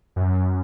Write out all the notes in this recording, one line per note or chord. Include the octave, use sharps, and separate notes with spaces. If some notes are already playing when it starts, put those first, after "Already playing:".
F#2